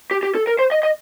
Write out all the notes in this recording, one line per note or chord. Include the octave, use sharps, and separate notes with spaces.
G4
G4
A4
A#4
C5
D#5
D#5